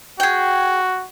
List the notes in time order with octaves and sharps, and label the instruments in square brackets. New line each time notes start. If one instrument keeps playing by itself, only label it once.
[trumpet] F#4 [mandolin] G#4 G5